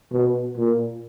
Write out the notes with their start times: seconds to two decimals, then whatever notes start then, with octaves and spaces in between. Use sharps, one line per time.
0.13 B2
0.57 A#2